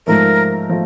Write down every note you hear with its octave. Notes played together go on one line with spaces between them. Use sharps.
G#2 F3 A3 A#4
F3 A3